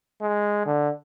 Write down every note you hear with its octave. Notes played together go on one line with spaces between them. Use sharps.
G#3
D3